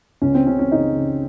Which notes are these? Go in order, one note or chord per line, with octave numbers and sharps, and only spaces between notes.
C#2 C#4
C4
C#3 C#4
C#4
C#3 D#4
C#3